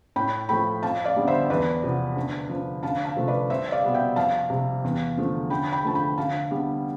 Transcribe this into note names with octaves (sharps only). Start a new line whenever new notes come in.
A2 G5 B5
F3 A3 G5 B5
F2 F5 A5
D5 F5
D3 G3 B3
C5 E5
E2 B4 D5
C3 F3 B3
D2
D3 F3
D2 F5 A5
F5 A5
C3 F3 A3
B4 D5
C2 C5 E5
D5 F5
B2 G3 B3
E5 G5
F2 F5 A5
C3 G3
E2
D3 F3 A3
D2 G5 B5
G5 B5
D3 F3 A3 A5
G5 B5
D2 F5 A5
D3 G3 B3